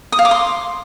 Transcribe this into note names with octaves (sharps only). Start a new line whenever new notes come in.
D#6
F5
D6
C6